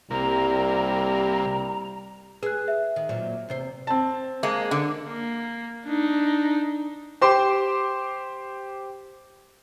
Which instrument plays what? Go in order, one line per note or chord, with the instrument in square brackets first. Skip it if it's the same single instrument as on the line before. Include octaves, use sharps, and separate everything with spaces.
[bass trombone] C2 [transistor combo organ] C3 A#3 [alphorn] G3 [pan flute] A#5
[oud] G#4 [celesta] B4 F#6
[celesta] E5
[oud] D#3
A#2 F#3 C4
E2 C3 C5
[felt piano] C4 A5
[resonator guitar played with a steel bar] G#3 A#3
D3
[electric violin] A#3
D4 D#4
[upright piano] G4 C5 C6 D6